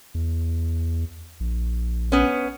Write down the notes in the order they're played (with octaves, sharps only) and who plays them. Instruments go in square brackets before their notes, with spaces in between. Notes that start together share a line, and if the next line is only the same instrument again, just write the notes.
[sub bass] E2
A#1
[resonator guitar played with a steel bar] B3 C#4